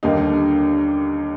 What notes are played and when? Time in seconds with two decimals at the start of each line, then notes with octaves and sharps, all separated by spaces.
0.03 D#2 D3 G3 A#3 D#4